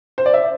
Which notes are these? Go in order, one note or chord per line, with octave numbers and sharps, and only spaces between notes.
C5
D5
E5